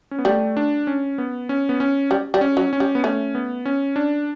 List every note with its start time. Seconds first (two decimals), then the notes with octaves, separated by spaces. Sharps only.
0.11 C#4
0.18 B3
0.25 G3 A3
0.57 D4
0.87 C#4
1.18 B3
1.49 C#4
1.69 B3
1.80 C#4
2.11 G3
2.34 G3
2.41 C#4
2.57 F#3
2.73 C#4
2.80 G3
2.95 B3
3.04 A3 C#4
3.35 B3
3.65 C#4
3.96 D4